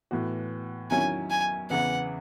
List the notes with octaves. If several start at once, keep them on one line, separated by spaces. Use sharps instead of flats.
A2 E3 B3 F#4
E2 D#3 F#3 C#4 E4 G#5
G#5
E2 C#3 E3 B3 E4 F#5